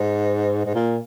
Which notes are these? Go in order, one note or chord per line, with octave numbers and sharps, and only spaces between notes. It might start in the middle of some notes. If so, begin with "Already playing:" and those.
Already playing: G#2
G#2
A#2